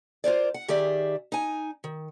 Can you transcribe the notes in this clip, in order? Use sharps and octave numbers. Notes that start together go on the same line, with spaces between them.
F4 A#4 C5 D5
F#5
D#3 G4 G#4 D5 E5
D#4 G#5
D#3